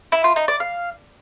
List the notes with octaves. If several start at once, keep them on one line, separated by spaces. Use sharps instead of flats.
E4
F4
D#4
D5
F5